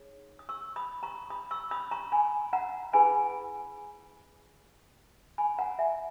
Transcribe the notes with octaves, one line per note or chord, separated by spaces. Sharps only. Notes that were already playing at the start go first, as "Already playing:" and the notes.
Already playing: D#4 G#4 C#5
D#6
C#6 E6
B5 D#6
A#5 C#6
B5 D#6
C#6 E6
B5 D#6
A#5 C#6
G#5 B5
F#5 A#5
E4 G#4 B4 G#5 B5
G#5 B5
F#5 A#5
E5 G#5